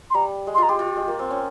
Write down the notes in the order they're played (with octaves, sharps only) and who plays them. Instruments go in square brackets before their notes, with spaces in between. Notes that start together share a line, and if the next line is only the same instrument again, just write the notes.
[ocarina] C6
[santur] G3 [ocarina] A#5
[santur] G#3
[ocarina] C6
[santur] F4 [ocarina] A#5
[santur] G4 [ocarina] C6
[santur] F4
G#3
A#3
C4
C#4